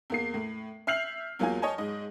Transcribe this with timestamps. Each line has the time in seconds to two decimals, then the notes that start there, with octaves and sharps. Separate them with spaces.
0.10 E2 A#3 C7
0.34 A2
0.87 E5 F6 G6 C7 F7 F#7
1.39 E2 F#3 A#3 F4 G#5
1.62 C#5 D#5 G#5 A5
1.78 G#2 D#5